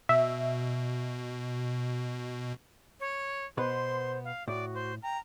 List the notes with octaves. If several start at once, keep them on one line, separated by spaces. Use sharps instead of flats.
B2 E5
C#5
B2 B3 B4 C5 C6
F5
A2 F#4 D5
C5
G5 A#5